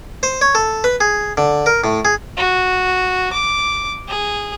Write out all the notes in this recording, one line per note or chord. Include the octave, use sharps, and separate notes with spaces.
C5
C#5
A4
B4
G#4
D3
A#4
A2
G#4
F#4
D6
G#4